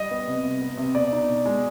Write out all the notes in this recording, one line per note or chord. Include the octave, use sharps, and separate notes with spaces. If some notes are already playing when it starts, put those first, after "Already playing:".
Already playing: G3 D#5
B3
C3
C3
B3
C3
B2 D5
D#4
B2
G#3